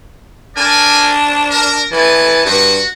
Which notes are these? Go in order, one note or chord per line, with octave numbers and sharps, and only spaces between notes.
D4 A#4 D5 G#5
A#4
E3 B3 G#5 A5
G2 F#4